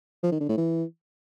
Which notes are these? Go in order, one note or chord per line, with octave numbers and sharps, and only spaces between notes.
F3
D#3
D3
A2
E3